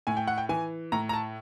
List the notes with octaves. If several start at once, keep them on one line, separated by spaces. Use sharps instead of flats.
A2 G#5
G5
F#5
G5
E3 G#5
A2 A#5
A#5
A5